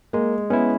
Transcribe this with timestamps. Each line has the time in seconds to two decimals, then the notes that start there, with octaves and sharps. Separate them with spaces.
0.13 G#3 A#3
0.50 B3 C#4 E4